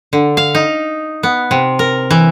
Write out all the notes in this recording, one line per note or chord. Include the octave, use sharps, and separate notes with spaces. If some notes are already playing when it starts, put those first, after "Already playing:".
D3
F5
D#4
B3
C3
A#4
E3